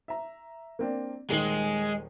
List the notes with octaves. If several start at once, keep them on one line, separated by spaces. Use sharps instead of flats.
E5 A#5
A#3 C4 D4
D#1 D#3 G#3 C7